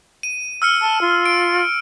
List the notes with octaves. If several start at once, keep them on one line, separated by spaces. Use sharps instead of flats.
D#7
E6 F6 C#7
A5
F4
D7